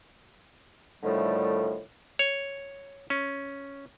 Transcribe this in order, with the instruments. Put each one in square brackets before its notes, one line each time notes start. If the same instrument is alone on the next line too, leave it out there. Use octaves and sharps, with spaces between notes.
[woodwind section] A2 D3 D#3 F3 G3 A3
[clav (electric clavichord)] C#5
C#4